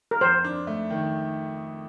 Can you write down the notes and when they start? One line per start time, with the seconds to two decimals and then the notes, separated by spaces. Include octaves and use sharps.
0.11 A#4
0.21 F2 C5
0.45 D4
0.67 A3
0.90 D#3